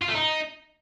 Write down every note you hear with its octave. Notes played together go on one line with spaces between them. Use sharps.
F4
A3
D#4